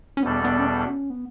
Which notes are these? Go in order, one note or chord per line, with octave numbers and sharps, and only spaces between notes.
C#4
E2 B2 G3 B3 D4 A4
B3
C#4
B3
C#4
B3